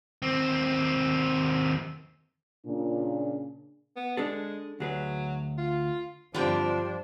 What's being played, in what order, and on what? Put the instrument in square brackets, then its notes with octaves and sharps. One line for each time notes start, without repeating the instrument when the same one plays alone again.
[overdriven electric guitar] D#2 C4
[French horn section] A#2 C#3 D4
[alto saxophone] B3
[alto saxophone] G#3 [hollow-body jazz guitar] D4 G#4 A4
[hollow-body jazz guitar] D2 G#4 B4 [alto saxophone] F#3
[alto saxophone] F4
[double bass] G2 F3 [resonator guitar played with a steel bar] D3 G3 C4 [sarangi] D4 [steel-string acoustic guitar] F4 G5